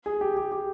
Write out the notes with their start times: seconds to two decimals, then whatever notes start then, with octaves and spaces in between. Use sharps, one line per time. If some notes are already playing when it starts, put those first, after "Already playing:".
0.06 G#4
0.21 G4
0.37 G4
0.52 G4